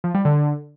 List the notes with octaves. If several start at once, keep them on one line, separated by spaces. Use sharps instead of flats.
F3
G3
D3